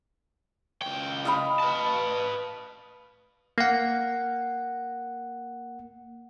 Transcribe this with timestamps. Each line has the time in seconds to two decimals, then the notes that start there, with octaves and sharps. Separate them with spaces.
0.82 C#2 G5
1.25 D#5 F5 B5
1.60 B4 A5
3.58 A#3 F#5